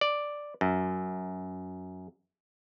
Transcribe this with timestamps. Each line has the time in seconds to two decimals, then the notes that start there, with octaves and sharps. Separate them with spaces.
0.01 D5
0.61 F#2